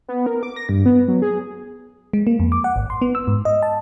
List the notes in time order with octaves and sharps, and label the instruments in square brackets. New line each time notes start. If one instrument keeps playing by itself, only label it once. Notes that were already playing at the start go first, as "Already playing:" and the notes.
[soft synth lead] B3
A#4
D6
A#6
G2
B3
F#3
G#4
[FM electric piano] G#3
A#3
F2
D6
F#5
G#1
C6
B3
E6
G#2
D#5
A5